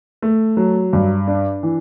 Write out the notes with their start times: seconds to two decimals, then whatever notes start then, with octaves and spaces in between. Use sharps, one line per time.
0.22 A3
0.57 F#3
0.93 G2
1.28 D4
1.63 E3